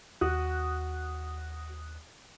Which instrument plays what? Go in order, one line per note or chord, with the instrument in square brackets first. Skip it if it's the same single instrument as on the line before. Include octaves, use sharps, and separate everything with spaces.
[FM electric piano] D#2 D#6 F#6 [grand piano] F#4